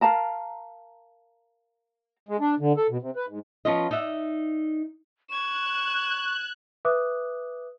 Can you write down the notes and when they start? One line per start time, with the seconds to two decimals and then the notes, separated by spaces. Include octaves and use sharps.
0.01 A#4 F5 A5 A#5
2.29 G#3
2.40 D4
2.60 D3
2.77 A4
2.90 B2
3.02 C3
3.16 B4
3.28 G#2
3.65 F3 B3 C#4 F4 D#5
3.91 D#4 D5 E5 F#5
5.30 C#6 F#6 G#6 E7
6.85 B4 E5 D6 D#6 F#6